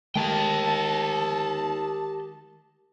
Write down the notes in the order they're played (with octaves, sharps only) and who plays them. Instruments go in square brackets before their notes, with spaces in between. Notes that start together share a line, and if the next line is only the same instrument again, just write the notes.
[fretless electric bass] D#3 G#3 A3 [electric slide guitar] G4 A#4 G5 [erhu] A5